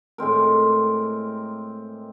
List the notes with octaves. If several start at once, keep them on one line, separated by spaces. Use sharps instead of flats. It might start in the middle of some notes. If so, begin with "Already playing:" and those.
A2 G#3 C4 A#4